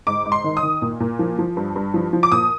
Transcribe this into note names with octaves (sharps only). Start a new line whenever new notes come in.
G#2 D6
G#2
C6
D#3
D#6
D#3
A#2
A#2
F3
F3
G2
G2
F3
F3
D6
A#2 D#6